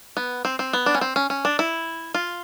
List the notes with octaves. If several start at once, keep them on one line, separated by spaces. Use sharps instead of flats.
B3
C4
C4
B3
D4
C#4
C4
C#4
C#4
D4
E4
F4